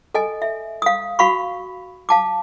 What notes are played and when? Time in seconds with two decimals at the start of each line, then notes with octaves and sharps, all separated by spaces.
0.14 A4 D#5 G#5
0.42 E5
0.82 F5 D#6
1.19 F#4 F5 B5 C#6
2.09 F5 A5 D6